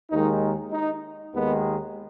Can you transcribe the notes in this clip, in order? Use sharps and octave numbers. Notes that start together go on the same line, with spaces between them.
D#2 D#3 G#3 D#4
D#4
D#2 D#3 G#3 B3